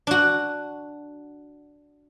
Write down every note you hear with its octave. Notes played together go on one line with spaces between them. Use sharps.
D4 F#4